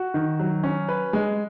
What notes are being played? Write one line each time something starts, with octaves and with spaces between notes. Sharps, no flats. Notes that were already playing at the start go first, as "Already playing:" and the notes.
Already playing: F#4
D#3
F#3
C#4
B4
G#3